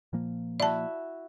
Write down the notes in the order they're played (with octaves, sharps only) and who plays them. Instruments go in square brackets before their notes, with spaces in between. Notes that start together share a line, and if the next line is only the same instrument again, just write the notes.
[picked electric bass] A#2 F3 A#3
[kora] E4 F#4 E5 [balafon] D5 A5